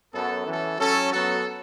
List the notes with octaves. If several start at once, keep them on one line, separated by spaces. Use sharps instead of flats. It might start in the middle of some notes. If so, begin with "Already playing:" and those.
F#2 F#3 B3 A4
E3 C#4 A4
F#3 C#4 A4
F#3 B3 F#4 A4